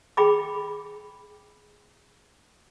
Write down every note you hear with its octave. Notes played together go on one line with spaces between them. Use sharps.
G#4 G5 B5 D6